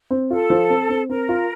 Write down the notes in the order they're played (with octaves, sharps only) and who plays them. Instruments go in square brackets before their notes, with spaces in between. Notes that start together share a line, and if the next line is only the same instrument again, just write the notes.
[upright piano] C4
[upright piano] F4 [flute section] A4
[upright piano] F3
C4
C4
[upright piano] C4 [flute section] A#4
[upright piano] F4